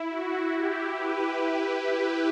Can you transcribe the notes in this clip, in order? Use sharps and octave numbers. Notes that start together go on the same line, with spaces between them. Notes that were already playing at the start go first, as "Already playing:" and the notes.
Already playing: E4
F#4
E4 G4
G4 B4